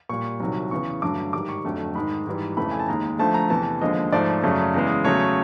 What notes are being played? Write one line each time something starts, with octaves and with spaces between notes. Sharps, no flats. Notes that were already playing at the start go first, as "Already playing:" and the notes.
A#2 G3 C#6
C2 C3 D#3 F#3
E2 C#3 E3 C#6
G2 D3 F#3 A3 D6
G#2 D#3 G3 D6
C#6
F2 D3 F#3 A3
G#2 D#3 G#3 B5
G#2 E3 G3
F2 C#3 E3 A3 B5
G#5
A5
D#2 D#3 G#3 A#5
D2 D3 F3 A3 A5
A#5
E2 C3 E3 A5
D#2 D3 F3 G#3 D#5
G#2 F3 A3 D5
F#2 C#3 F#3 A3
E2 C#3 E3 G#3
E2 C#3 F#3 A3 C#5